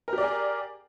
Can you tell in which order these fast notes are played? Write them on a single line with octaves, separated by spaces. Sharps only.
A#4 G4 D5 G#4